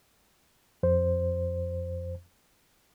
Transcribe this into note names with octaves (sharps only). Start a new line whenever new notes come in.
F2 C5